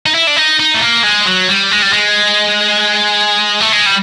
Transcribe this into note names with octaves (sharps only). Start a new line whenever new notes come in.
D#4
E4
D4
D#4
D#4
A3
A#3
G#3
F#3
G3
G#3
G3
G#3
A3
G#3
G3